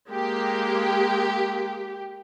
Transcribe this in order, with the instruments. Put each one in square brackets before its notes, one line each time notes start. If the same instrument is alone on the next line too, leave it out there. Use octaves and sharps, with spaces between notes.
[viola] G#3 A#3 [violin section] G4